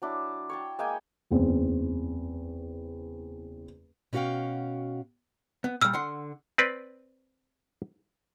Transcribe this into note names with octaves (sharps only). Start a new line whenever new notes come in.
F#3 D4 E4
C#5 G5 A5
G#3 A#3 G5 G#5
F#1 E2 C4
B2 C#4 F#4 A#4 F5 G5
B3
A#2 G3 E6 F6
D3 F#5 C6
C4 B4 D5